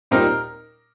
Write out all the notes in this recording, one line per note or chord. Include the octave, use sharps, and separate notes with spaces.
A#2 G3 C4 D#4 A#4